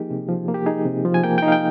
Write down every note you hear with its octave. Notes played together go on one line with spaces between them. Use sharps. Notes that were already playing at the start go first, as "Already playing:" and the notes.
Already playing: F3 A#3 D#4 G4 G#4
C3
F3
A#3
G4
D#4 G#4
C3
F3
G#5
A#3 G5
D#4 G5
F5
G5